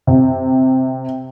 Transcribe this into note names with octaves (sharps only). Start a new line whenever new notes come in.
C3